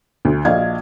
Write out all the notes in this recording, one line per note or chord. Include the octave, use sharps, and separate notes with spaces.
D2
A#1 D#5 F5 G#6